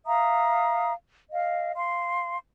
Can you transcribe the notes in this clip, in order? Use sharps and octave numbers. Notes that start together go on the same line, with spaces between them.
E5 F5 A#5 D#6
D#5 F5
F5 C6